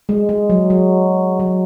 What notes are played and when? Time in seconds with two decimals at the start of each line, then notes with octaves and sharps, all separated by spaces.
0.09 G#3
0.29 G#3
0.50 F#3
0.70 F#3
1.40 F#3